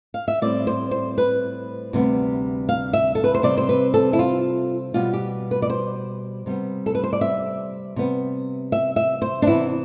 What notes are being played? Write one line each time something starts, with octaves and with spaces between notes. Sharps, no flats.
F5
E5
A2 G3 C4 D5
C5
C5
B4
D2 C3 G3 B3
F5
E5
A4
B4
C5
C3 G3 C4 D5
C5
B4
A4
E4
F4
B2 G3 B3 F4
G4
B4
D5
C5
C3 G3 B3
A4
B4
C5
D5
E5
C3 G3 B3
E5
E5
C5
D4
C3 E3 B3 E4